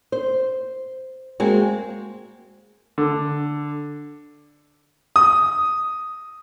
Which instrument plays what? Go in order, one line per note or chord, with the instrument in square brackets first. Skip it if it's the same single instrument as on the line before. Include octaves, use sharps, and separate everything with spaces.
[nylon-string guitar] C5
G#3 A#3 C4 F#4
[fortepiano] D3
[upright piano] D#6